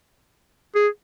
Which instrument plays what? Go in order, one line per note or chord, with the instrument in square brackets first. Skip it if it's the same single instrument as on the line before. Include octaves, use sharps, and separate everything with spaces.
[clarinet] G#4